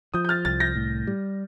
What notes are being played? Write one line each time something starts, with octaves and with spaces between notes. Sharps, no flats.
F3 D#6 G6
G6
F6 A6
C2 F6 A6
G6 A#6
A2
G3